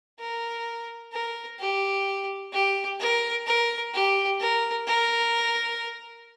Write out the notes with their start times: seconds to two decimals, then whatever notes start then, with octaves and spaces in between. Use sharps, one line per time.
0.20 A#4
1.13 A#4
1.60 G4
2.53 G4
3.00 A#4
3.46 A#4
3.94 G4
4.40 A#4
4.87 A#4